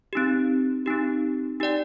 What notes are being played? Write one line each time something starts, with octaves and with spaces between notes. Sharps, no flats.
C4 D#4 G4
C4 D#4 G4
D#4 G4 D5 G5